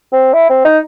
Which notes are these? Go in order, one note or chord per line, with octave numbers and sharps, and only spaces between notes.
C4
E4
C4
D#4